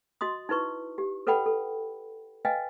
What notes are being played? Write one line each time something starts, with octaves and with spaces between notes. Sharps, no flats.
F#4 D#5 C6 D#6
D#4 E4 B4 C#6
G4
A4 B4 D5 F#5 G5 B5
A4
B4 D#5 F5 G5 G#5